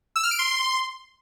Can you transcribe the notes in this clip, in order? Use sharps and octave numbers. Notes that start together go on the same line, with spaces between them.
E6
F6
D7
C6